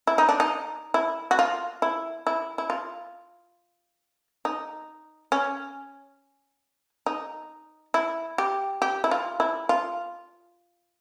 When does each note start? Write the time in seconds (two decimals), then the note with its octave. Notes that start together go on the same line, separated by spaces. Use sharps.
0.07 E4
0.18 D#4
0.29 D4
0.40 D#4
0.94 E4
1.31 F#4
1.39 F4
1.82 E4
2.27 E4
2.58 E4
2.70 F4
4.45 D#4
5.32 C#4
7.06 D#4
7.94 E4
8.38 G4
8.82 G4
9.04 E4
9.11 F4
9.40 E4
9.69 F4